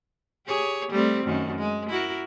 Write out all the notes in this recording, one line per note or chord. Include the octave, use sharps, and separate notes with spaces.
G4 G#4 C#5
G3 A3 C4
F#2 D#3
G#3
E4 F#4 A#4